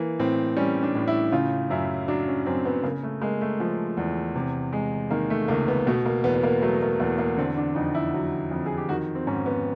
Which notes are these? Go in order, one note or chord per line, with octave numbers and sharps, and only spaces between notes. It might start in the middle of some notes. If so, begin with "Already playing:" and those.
Already playing: E3 A#3
A2 C4
G3 C#4
D4
A2
E4
C#3 F4
F#2 E4
F#3 D4
C#4
F#2 C4
B3
C#3 A#3
A3
G#3 A#3
A3
F3
E2
C3
G#3
D#3 A#3
A3
C#2 A#3
B3
B2 A3
A#3
E2 B3
B3
A#3
F#3 A3
A#3
E2 A#3
A#3
D3 C4
D4
F2 D#4
E4
F#3
F2
G#4
G4
D#3 F#4
C4
G#2 C#4
B3